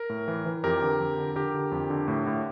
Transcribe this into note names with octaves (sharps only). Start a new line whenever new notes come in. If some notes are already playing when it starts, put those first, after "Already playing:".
Already playing: A#4
A2
E3
E3
F2 G4 A#4
D3
F2
D3
D3 G4 A#4
D3
F2
D3
A2
A2